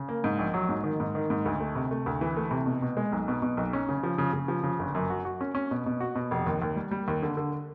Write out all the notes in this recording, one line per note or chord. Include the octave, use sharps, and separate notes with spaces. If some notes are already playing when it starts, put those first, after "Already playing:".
Already playing: C#3
A#3
G#2
A#1
F#3
G#2
D#3
G#2
D#3
G#2
D2
A3
C3
A3
D2
E3
A3
C3
B2
B2
G#3
B1
B2
B2
B1
C#4
C#3
F3
C#3
C#3
F3
C#3
G1
F#2
F#4
F#4
C#4
C#4
B2
B2
F#4
B2
F1
D#2
D#2
G3
G3
D#2
D3
D3